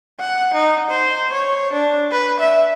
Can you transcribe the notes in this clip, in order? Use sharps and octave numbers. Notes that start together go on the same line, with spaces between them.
F#5
D#4
C5
C#5
D4
B4
E5